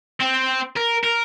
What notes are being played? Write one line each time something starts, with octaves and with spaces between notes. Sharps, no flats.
C4
A#4
A#4